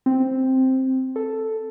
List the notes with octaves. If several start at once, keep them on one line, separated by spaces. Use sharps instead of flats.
C4
A4